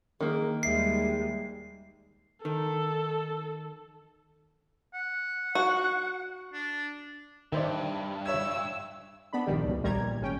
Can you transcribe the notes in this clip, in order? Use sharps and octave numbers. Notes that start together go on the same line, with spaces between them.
D#3 A#3 G#4
D#2 G3 G#3 E5 C7
D#3 A4
F#5
F#4
D4
G2 D#3 C5 D5 E5
C#5 E5 E6 G#6
B3 D4 B5
A#1 G2 D#3 G3
C#2 B2
A#1 D#2 D#3 G3 A#5 G#6
A#2
G#1 C#4 G5